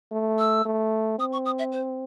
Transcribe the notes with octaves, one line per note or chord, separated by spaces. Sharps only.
A3
E6
A3
C4 D#6
C#6
D#6
E5
C5